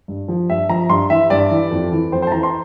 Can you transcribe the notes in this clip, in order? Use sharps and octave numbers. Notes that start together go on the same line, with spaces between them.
G2
F3
G2 E5
F3 A#5
G2 C6
E3 E5
G2 D5
E3
F2
E3
F2 C5
C5
A5
E3 A#5
C6